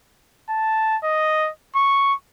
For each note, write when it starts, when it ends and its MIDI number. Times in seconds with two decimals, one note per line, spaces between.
0.49 0.96 81
1.04 1.49 75
1.75 2.14 85